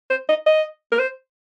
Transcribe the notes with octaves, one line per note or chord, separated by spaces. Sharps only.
C5
D#5
D#5
A#4
C5